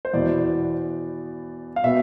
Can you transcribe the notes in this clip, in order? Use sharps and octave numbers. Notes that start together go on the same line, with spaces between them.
C5
E2 B2 B3 E4 D5
F5
B2 B3 E5